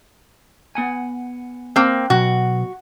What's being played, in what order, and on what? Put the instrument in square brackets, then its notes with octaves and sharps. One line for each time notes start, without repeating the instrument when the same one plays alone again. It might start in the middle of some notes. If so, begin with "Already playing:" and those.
[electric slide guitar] B3 F#5 G#5
[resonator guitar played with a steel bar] A#3 C4
[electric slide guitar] B2 F#3 [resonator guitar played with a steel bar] F#4